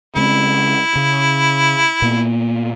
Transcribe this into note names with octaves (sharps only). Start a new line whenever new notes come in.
C#3 G#3 C4 E4
C#3
A#2 A#3 B3